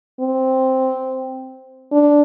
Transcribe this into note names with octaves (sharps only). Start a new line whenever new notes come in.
C4
D4